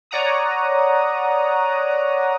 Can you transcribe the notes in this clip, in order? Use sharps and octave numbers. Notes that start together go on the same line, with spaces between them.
C#5 D5 F#5 A#5 D#6